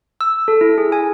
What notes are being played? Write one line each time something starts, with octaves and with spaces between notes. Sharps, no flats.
E6
A4
E4
G#4
G#5